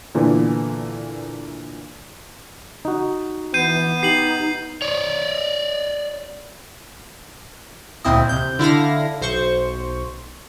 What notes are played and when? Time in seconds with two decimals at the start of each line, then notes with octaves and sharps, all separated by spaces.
0.15 A#2 D3 E3 B3
2.85 D#4 F#4
3.54 E3 B3 G6 C7 D#7
4.03 D#4 G4 C7 F#7
4.82 C#5 D5
8.04 D2 A#2 C4 E4 D#5
8.29 C3 G6
8.59 D3 E4 F5 A#6
9.21 B1 C5 C#6